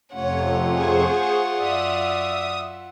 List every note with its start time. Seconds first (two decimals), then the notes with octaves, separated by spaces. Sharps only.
0.14 F2 C3 A3 C#4 F4 C#5 F#5
0.71 G#4 C5 C#6
1.57 F#2 D5 E5 F5 D#6